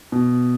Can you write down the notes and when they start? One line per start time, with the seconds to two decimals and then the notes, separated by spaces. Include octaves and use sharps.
0.12 B2